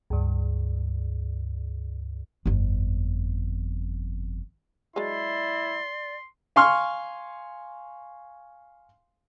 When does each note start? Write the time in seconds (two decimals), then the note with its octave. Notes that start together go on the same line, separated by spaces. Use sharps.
0.10 C#2 G2
2.46 G1 F2
4.96 F#3 G#3 E4 D5 C6
6.56 F5 G#5 C6 C#6 F6